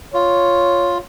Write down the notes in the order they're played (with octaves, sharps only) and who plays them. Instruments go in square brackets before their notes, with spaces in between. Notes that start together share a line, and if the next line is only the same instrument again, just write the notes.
[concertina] F4 [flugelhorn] C#5